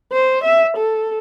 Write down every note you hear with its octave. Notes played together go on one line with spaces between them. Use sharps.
C5
E5
A4